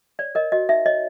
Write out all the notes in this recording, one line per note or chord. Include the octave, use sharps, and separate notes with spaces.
C#5 D5
A#4 D#5
F#4 D#5
D#4 E5
C#5 D#5